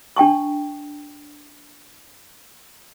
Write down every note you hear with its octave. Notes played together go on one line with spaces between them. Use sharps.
D4 G5 A5 C#6